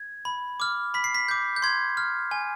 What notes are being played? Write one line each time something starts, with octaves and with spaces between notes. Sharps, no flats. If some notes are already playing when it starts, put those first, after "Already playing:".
Already playing: G#6
B5
D6 F6
B5 B6
C7
B6
D6 G6
G6
C6 G#6
F6
G#5